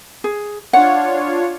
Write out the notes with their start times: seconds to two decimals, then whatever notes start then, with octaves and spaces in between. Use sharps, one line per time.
0.24 G#4
0.73 D4 F4 C#5 F#5